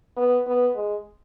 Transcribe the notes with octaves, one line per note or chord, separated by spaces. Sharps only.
B3
B3
G#3